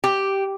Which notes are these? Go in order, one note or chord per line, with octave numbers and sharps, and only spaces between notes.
G4